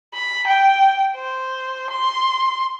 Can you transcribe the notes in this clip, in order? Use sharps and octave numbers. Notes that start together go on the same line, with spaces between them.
B5
G5
C5
C6